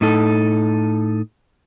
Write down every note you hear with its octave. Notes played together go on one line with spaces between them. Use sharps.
A2 D#4 A4